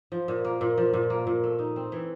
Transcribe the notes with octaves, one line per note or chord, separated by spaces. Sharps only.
F3
A#2
A#3
A#2
F3
A#2
A#3
A#2
A3
D#4
C4
E3